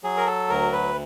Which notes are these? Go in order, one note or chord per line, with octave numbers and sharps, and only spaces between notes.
F#3 G#4
A#4
A4
D2 A#4
B4